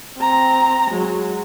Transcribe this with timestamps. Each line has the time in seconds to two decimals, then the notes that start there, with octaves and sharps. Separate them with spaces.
0.19 C4 A#5
0.91 F#3 G#3